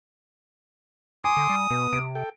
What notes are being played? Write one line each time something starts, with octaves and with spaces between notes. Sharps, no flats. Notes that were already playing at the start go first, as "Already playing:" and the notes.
G#5 C6 D6 D#6
D3
G3
B2 B3
C3 D7
A4 G5